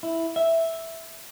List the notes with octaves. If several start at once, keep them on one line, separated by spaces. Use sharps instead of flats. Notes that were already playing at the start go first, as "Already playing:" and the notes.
E4
E5